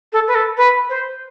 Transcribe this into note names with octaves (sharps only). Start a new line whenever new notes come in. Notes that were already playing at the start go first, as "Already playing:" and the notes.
A4
B4
A4
B4
C5